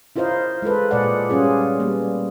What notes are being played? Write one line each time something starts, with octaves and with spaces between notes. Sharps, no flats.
E4 F4 A#4 C5 D#5 F5
G#3 F4 A4 B4
A#2 G#3 G#4 D5 F#5
G3 C#4 F4 G#4
G3 A#3 B3